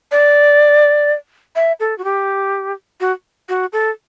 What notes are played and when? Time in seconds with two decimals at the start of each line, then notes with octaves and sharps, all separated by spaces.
0.11 D5
1.56 E5
1.80 A4
1.98 F#4
2.04 G4
3.00 F#4
3.49 F#4
3.73 A4